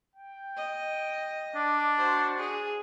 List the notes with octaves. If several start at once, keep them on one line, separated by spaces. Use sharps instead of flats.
G5
D#5
D4 D6
F#4 C5
G#4